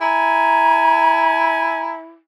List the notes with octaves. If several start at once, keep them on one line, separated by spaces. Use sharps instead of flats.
E4 G#5 A#5